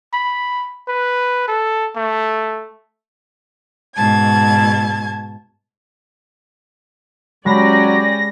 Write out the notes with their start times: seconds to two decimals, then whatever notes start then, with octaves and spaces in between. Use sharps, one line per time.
0.13 B5
0.88 B4
1.48 A4
1.96 A3
3.95 G#2 B2 A5 G#6
7.46 F#3 G#3 C#4 G4 D5 B5 A#6